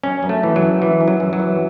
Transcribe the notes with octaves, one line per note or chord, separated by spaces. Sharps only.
F#2 C#4
F#2
A3
E3
F#3
F#2
E3
F#2
F#3
F#2
F#3
E3